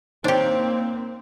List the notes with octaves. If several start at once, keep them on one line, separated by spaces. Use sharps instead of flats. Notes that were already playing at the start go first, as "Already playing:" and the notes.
A#3 C4 D4 D#4 G4 C5 C#5